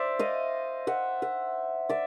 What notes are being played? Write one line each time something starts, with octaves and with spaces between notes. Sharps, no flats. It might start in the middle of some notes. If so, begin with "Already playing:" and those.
Already playing: C5 D5 E5
D#5 F5
E5 F#5
E5 F#5
D5 E5